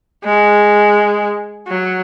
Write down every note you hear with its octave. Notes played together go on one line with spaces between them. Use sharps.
G#3
F#3